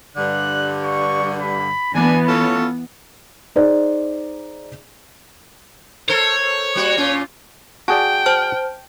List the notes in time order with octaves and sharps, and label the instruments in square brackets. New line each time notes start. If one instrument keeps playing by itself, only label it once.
[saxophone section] G2 D3 [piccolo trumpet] F#6
[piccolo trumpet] C#6
B5
[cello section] E3 B3 [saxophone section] D4 [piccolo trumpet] G#5
[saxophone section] C#4 F4 A4 [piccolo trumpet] C#5
[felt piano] D#4 G#4 C5 D5
[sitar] A4 A#4 C5 [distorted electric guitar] C#5
[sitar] G3 A#3 F#4
A#2 C#4 F4
[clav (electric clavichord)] F#4 G#4 D5 [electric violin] G5 [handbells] A5
[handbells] C5 A5 F6